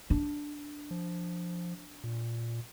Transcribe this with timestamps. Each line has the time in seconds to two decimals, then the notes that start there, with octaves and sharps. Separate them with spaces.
0.10 D4
0.91 F3
2.04 A#2